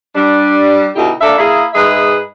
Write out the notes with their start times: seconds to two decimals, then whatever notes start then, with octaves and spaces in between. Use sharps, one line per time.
0.15 G3 D4
0.95 B2 D3 D#4 E4 G4
1.21 A#3 D4 A4 D5 E5
1.38 A#3 E4 G#4
1.73 G#2 G#4 B4 D#5 E5